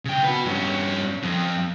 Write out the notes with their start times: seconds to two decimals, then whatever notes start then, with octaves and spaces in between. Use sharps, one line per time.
0.05 C#3 G5
0.24 F#4 B4
0.46 G2 C#4
1.23 F2